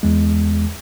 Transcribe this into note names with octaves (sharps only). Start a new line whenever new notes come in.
E2 G#3